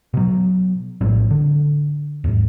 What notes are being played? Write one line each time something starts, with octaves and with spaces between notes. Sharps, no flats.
B2 F#3
A#1 A2 G3 C4
D3
D#2 G#2